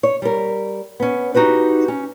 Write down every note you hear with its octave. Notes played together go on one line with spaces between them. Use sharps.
C#5
G3 A#4
B3 C#4
D#4 F#4 G4 B4
C#4